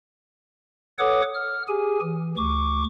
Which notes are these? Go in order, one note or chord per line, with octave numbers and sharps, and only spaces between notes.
A4 B4 C#5 F#5 D6 D#6
F6
G4 G#4 G#5
E3
D2 C#6 D6